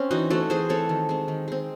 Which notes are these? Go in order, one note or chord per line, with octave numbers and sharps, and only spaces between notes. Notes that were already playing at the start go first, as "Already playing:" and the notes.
Already playing: C4 C#4
E3 D#4 F#4
A3 C4 F#4 A4
E3 G#4 C5
A3 C4 A4 C#5
D#3
G#3 C4
D#3
G#3 C4